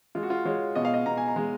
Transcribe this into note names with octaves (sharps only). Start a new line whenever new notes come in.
G#3 F4
F#4
F4
G#3 C#5
B2 D#5
F5
D#5
B2 A#5
G#5
A#5
G#3